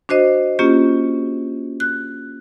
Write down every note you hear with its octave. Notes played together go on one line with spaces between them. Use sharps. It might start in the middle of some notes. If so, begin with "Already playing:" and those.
D4 F#4 C5 D#5
A#3 C#4 F4 G4
F#6